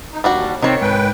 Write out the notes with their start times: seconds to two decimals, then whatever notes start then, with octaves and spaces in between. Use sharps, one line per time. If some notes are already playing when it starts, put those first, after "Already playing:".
0.13 D#4
0.24 D#2 G3 D4 F#4
0.62 C3 D#3 C4 C#5
0.81 G#2 B4 G5